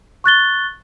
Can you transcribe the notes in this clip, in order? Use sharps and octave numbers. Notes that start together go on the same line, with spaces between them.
C#6 F#6 A6 G7